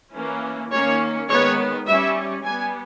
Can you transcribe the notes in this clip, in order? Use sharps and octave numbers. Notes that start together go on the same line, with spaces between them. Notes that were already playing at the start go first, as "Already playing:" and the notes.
E3 A#3 C#4
D#3 A#3 C#4 C#5
D#3 G#3 B3 C#5
G3 C#4 E5
G3 B3 G#5